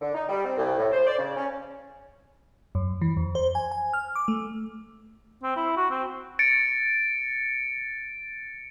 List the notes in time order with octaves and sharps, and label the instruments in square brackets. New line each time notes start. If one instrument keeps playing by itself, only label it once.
[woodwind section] D3
D#4
G3
C4
C2
A2
C5
D5
C#3
C#4
[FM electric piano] F#2
E3
F2
C5
G#5
G#5
F6
D6
A3
[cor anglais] C4
E4
F#4
C4
[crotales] A6 C#7 D7